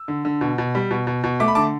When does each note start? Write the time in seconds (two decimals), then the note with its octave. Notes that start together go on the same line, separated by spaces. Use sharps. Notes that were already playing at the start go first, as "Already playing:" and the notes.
Already playing: E6
0.08 D3
0.25 D3
0.41 B2
0.58 B2
0.75 G3
0.91 B2
1.07 B2
1.24 B2
1.40 A3 D6
1.48 B5
1.55 D3 A5 D6